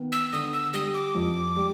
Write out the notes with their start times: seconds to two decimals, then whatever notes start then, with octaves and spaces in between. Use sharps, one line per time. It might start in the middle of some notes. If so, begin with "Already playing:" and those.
Already playing: D#3 B3
0.12 E6
0.32 D3 D#6
0.53 E6
0.74 G3 D#6
0.94 D6
1.15 F2
1.56 G3